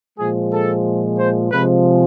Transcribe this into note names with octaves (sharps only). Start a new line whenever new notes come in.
A#2 F3 G#3 G#4
A4
C5
C3 F3 G#3 B4